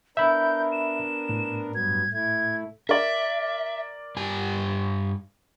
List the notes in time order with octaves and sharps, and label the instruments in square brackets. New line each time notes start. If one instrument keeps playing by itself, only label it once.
[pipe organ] B3 D4 A#4 [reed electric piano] E5 B5 [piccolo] G6
[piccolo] E7
[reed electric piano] A2
[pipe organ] G2 F#3 B3 [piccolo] G#6
[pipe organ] A3 E4 [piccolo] G#6
[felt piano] A#4 D5 [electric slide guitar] E5
[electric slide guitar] G2 G4 G#5